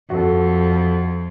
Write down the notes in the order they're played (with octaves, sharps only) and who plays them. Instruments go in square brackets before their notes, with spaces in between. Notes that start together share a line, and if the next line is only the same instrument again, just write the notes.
[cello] F2 [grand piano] F#4 A4